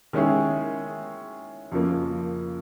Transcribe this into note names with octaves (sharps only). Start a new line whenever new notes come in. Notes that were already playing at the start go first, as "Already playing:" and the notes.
D#3 G#3 C#4 E4 G#4
F2 C#3 F3 A#3